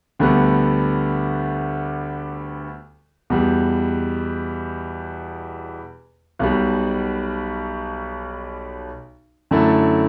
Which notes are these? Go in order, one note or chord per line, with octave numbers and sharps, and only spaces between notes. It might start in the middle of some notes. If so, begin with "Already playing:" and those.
D2 D3 G3 B3
E2 B2 G3
B1 B2 G3
F#2 D3 A3 E4 A4